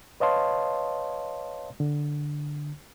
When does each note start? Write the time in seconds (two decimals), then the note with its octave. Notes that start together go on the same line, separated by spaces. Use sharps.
0.20 B4 C#5 D#5 F5 A5 C6
1.80 D3